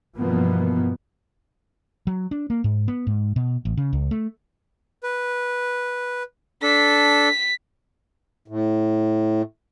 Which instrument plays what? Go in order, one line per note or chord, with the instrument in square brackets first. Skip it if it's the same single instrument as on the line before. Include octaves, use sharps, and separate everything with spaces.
[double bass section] G2 B2 E3 F3 A#3 B3
[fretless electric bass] F#3
D4
A#3
G#2
B3
G#2
B2
A1
C#3
C#2
A3
[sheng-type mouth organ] B4
[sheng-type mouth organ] D4 A4 [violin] B6
[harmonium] A2